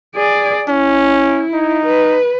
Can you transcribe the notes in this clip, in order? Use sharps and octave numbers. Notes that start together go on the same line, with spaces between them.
G#4 D5
C#4 E4
D#4
B4